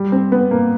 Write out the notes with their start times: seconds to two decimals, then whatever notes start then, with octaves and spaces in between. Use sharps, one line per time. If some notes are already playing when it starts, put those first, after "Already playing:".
Already playing: G3
0.12 C4
0.32 B3
0.51 A#3